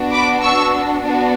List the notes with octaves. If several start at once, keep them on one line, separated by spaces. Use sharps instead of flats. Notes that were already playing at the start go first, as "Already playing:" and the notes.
Already playing: B3 D4 F#4
B5 D6
C#6 E6
B3 D4 F#4